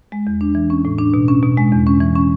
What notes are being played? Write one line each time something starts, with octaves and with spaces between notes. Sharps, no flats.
G#3
E2
D4
E3
C#4
A2
D4
B2
C#4
B2
G#3
E2
C#4
E3
C#4